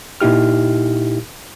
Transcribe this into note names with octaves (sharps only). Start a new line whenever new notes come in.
A#2 D#4 E4 G4 F6